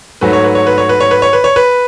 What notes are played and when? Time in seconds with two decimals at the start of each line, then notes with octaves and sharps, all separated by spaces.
0.21 G#2 F#3 A3 B4
0.33 C#5
0.44 B4
0.55 C#5
0.67 B4
0.78 C#5
0.89 B4
1.00 C#5
1.11 B4
1.22 C#5
1.33 B4
1.44 C#5
1.56 B4